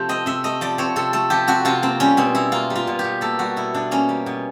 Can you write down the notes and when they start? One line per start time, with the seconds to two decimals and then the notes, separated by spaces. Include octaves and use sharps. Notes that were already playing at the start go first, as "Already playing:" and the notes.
Already playing: C3 F3 A3 C5
0.09 C4 D#5
0.26 C3 E5
0.44 A3 D#5
0.61 F3 D5
0.78 C4 C#5
0.96 C3 A4
1.13 A3 A4
1.30 F3 G4
1.47 C4 F#4
1.65 C3 F4
1.83 A#3 C4
2.00 G3 C#4
2.17 B2 C4
2.35 B2 E4
2.52 A#3 F4
2.70 G3
2.75 F4
2.87 B2
2.99 B2 G4
3.21 A#3 A4
3.39 G3 F#4
3.56 B2 E4
3.74 B2 D4
3.91 A#3 C#4
4.09 G3
4.26 B2